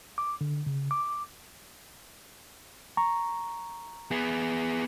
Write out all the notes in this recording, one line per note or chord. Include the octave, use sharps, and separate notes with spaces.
D6
D3
C#3
D6
A#5 C#6
B3 G#4